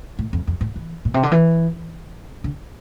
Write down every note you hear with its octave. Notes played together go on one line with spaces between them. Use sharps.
A2
F2
F2
A2
E3
A#2
C3
D3
E3
D3